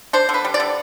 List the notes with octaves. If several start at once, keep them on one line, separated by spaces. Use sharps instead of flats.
D4 C5
D3
B4
G3
D5
D3